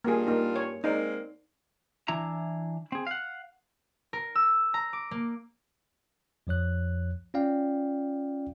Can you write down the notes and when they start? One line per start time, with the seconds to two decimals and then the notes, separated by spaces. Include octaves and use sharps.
0.04 G2 A#3 F4 G#4
0.27 A#3 D#4
0.56 C#5
0.84 G#3 A#3 C4 D#4 D5
2.08 E3 D4 E4 A#5
2.92 C4 G#4
3.07 F5 F#5
4.13 A#4
4.35 E6
4.74 A#5
4.93 D6
5.11 A#3
6.47 F2 F3 C#5 F#6
7.34 C#4 F4 D5 F5 G5